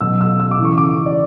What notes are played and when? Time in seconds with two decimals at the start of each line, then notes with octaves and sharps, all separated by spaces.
0.01 B2 F#3 E6
0.21 E6
0.40 E6
0.51 D6
0.58 C#3 E3
0.65 C#6
0.78 D6
1.06 D5